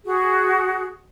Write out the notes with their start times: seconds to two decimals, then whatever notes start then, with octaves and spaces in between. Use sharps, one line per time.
0.05 F#4 G#4